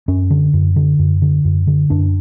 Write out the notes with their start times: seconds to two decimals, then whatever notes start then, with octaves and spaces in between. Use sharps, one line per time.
0.08 F#2 C#4
0.30 D3
0.54 F#2
0.76 D3
0.99 F#2
1.22 D3
1.45 F#2
1.67 D3
1.90 F#2 D4